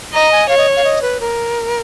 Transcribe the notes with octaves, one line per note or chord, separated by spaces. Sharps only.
D#5 A#5
G#5
C#5 F5
D#5
F5
D#5
B4
A#4